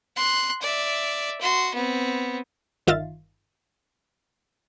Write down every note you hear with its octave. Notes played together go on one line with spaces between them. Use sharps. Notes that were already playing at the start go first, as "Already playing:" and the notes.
C6 F#6
D5 E5
F#4 C6
B3 C4
G1 D#3 F4 E5 F5 A6